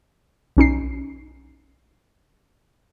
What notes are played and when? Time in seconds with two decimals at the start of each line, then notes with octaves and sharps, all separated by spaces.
0.57 B1 C#4 D#4 C7